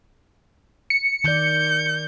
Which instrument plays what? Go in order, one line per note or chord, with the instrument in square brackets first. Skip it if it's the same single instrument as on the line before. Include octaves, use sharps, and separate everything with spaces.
[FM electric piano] C#7
[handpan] D#3 D5 [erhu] G6